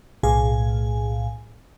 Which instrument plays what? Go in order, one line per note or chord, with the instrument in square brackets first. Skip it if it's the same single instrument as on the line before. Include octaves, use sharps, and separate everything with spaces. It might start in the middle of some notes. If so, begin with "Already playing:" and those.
[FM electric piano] B1 A2 G#4 F5 G#5